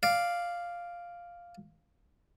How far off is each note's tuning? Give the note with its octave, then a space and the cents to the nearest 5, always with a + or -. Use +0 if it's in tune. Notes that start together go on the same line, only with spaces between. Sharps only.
D5 +0 F5 +0